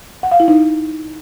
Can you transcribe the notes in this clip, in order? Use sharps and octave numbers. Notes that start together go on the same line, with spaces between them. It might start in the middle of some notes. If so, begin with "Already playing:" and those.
F#5
F5
E4
D#4